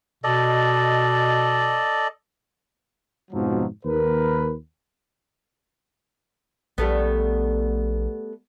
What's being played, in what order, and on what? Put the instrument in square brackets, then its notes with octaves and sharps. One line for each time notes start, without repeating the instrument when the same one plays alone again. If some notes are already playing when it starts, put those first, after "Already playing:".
[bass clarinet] B2 [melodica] A4 D5 D#5
[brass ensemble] F2 G#2 B2 F3 F#3
D#2 A#4 B4
[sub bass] A#1 [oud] G3 A3 B3